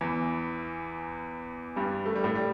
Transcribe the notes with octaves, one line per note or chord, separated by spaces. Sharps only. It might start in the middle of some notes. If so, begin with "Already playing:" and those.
E2 E3
G2 G3
A3
G3
A2 A3
G3